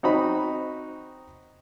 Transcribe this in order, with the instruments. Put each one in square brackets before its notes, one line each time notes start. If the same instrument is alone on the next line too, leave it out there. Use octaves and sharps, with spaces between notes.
[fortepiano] C4 D#4 F#4 B5